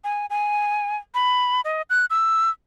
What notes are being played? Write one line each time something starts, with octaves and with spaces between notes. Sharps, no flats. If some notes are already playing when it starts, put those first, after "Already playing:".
G#5
G#5
B5
D#5
F#6
E6